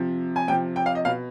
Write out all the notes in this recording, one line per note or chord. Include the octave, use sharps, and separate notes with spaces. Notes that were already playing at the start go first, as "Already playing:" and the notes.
Already playing: C3 F3
G#5
C3 F3 G5
G5
F5
D#5
B2 F5